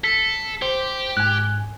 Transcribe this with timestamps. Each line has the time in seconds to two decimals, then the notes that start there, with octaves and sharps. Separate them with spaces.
0.04 A4 B6
0.62 G4 C5
1.17 G#2 G#5 F#6